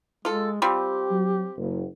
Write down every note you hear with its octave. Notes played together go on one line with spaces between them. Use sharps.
G#3 F4 A4
G3 C4 F4 G4
F#3
F#1